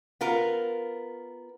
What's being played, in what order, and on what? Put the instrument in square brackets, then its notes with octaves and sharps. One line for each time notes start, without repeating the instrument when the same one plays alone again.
[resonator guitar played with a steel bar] B3 F4 A#4